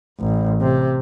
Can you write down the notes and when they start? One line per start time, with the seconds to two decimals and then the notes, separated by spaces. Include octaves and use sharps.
0.20 A1
0.61 C3